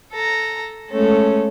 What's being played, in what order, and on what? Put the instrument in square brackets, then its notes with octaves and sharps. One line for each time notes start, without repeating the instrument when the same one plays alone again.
[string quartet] A4 A#5
G#3 A3 C#4 A4